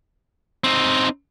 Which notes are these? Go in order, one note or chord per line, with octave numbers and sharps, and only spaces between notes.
C4 D#4